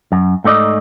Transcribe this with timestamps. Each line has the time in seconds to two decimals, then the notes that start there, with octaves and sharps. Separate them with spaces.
0.12 F#2
0.44 G#2 A3 D#4 D5 D#5